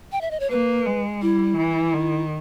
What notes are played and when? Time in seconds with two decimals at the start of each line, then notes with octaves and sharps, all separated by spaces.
0.12 G5
0.21 E5
0.31 D#5
0.40 C#5
0.50 A#3 B4
0.86 G#3
1.22 G3 E4
1.58 E3
1.93 D#3